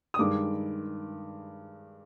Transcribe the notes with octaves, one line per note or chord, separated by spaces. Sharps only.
D#6
G2 D#3 G#3 D6